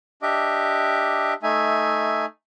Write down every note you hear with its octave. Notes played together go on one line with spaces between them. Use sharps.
D4 G4 D#5 E5 D6
A3 D#4 E5 G#5